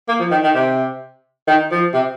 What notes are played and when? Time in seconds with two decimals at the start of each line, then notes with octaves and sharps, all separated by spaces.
0.08 A#3
0.20 F3
0.31 D#3
0.44 D#3
0.54 C3
1.48 D#3
1.71 F3
1.94 C3